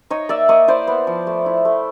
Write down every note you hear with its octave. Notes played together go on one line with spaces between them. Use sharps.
D#4 C#5 D#5
A#3 D5 E5
A#3 C#5 D#5
E4 C5 D5
B3
F3
A3
E4
A3